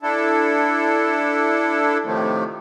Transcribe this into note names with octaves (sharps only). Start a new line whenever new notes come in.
D4 E4 A4
A2 C3 D#3 F3 A3